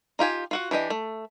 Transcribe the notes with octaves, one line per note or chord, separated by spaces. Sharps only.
D#4 F4 G4 G#5
F4 F#4 F#5
E3 D4 G4 D#5
A3